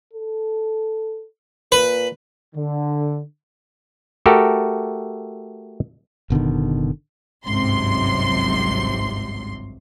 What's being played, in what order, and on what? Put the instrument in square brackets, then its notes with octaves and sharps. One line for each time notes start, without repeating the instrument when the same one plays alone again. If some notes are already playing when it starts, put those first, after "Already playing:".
[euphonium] A4
[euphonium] A#2 [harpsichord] B4
[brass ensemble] D3
[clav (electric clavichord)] A3 F#4 G4 A4 A#4
[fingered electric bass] F#1 B2 D3 D#3
[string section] G#1 C#2 G2 C3 F#3 C6